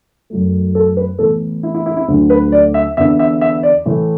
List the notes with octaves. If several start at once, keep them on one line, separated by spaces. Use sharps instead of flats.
F#2 F#3 A3
A4
B4
A2 E3 B3 A4
E4
E4
E4
E4
D2 D3 F#3 A3
B4
D5
E5
E2 D3 B3 E5
E5
E5
D5
A2 E3 A3